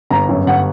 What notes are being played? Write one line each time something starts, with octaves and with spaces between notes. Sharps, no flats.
G1 A#5
F#2
G1 F#5